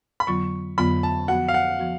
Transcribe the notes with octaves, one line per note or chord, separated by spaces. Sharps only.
B5
F2 D3 F#3 B3 F4 C#6
F2 D3 F#3 B3 F4 B5
A5
F3 B3 F#4 F#5
F5
F#5
F3 B3 F#4